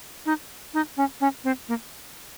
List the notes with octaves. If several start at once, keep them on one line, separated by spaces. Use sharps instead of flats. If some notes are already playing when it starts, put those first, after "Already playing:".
D#4
D#4
C#4
C#4
C4
A#3